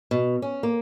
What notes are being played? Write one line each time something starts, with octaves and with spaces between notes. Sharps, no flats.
B2
C#4
A#3